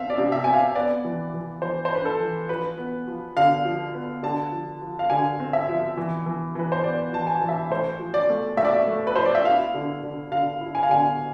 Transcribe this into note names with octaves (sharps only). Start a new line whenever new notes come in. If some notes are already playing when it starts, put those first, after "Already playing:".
Already playing: C4 E5 F5
D5
C3
E5
C4 G#5
F5
B3 D5
E3
E3
E3 C5
C5
D4 B4
A4
E3
F3 B4
B3
F3
D3 F5
F3
B3
D3 A5
F3
F3
F5
D3 G#5
C4
E5
F3
E3
E3
E3 B4
C5
B3 D5
E3 A5
G#5
E3
E5
A2 C5
F3
D5
A3
A2 E5
D5
E5
A3
B4
F3 C5
D5
E5
E4 F5
D3
D3
D3 F5
E4
G#5
F5
D3 G#5